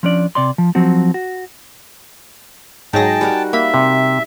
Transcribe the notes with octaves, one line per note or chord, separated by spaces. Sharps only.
F3 C#4 D4 D5
C3 D5 C6
F3
F3 F#3 C4 F#4
F#4
G#2 F#3 D#4 G#4 G5 A5 A#6
G3 F#4 A#4
A#3 E5 B5
C3